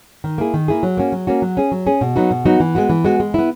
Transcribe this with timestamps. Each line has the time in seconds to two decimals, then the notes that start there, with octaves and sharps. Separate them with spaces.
0.24 D#3
0.38 A#3 E4 G#4
0.54 D#3
0.68 A#3 E4 G#4
0.83 F#3
0.97 A#3 C#4 F#4
1.12 F#3
1.27 A#3 C#4 F#4
1.42 F#3
1.57 C#4 G#4
1.72 F#3
1.87 C#4 G#4
2.01 B2
2.16 F#3 B3 D#4 F#4
2.31 B2
2.45 F#3 B3 D#4 F#4
2.60 E3
2.75 G#3 B3 F#4
2.89 E3
3.05 G#3 B3 F#4
3.20 G#3
3.34 B3 E4